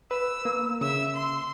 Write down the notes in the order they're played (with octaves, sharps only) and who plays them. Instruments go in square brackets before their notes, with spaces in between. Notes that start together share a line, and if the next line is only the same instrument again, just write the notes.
[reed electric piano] B4 [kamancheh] E6
[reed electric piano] A#3
[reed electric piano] C#3 [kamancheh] E5 E6
[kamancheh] C6